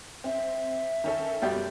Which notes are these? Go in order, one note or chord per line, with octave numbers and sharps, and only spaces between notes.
C4 E5
D#3 C#4 A4
F#1 B2 G3 A3 G4